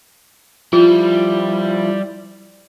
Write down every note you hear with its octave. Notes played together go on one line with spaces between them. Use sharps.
F3 G3 E4 F4